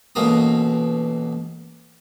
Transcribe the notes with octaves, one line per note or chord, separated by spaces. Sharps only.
A1 B2 A#3 D#6